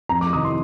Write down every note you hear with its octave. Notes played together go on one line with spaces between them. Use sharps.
F2 A#5
D6
C3 D#3 D#6
C6